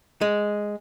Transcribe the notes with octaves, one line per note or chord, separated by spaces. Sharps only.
G#3